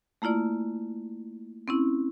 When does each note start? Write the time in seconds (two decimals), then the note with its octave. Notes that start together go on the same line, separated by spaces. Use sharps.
0.22 A3 A#3 E4 F4 D5
1.68 C4 C#4 E4